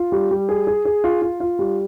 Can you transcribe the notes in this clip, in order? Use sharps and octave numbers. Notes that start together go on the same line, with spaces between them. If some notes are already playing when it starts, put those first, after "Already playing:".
Already playing: F4
G3
G3
G#4
G#4
G#4
F4
F4
F4
G3